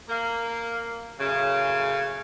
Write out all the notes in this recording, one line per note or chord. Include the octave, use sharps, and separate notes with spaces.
A#3
F#2 A2 C#3